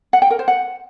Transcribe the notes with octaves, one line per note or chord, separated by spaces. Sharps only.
F#5
G5
A#4
C5
F#5